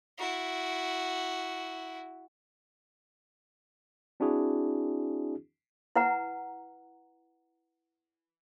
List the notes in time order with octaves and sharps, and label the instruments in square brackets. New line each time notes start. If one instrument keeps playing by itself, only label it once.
[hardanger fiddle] E4 F#4
[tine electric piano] C4 D4 E4 F#4 G#4
[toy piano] E4 B4 F#5 A#5